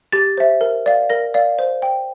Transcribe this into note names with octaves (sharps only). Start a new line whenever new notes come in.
G4 A6
C5 E5
A#4
D5 F5
A#4 A#6
D5 F5
C5
G5